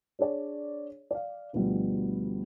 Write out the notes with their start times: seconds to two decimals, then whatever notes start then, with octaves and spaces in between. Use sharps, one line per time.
0.19 D4 G#4 C#5 D5
1.11 D5 F5
1.53 D2 B2 F3 G3